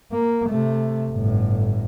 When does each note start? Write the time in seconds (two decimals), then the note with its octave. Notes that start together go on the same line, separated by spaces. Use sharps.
0.12 A#3
0.49 C3 A3
1.11 G1 A2